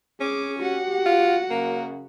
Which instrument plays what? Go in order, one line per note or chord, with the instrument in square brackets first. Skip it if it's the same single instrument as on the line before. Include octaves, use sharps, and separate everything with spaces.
[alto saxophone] C#4 [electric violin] G#4 D6
[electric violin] F#4 F#5 [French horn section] G4
[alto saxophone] F4
[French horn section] F#2 C#3 [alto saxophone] A#3